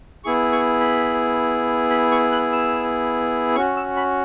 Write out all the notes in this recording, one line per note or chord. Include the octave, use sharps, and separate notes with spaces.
B3 E4 G#4 C#6
C#6
B5
B5
C#6
F#6
E6
C#4 F#4 C#6
E6
B5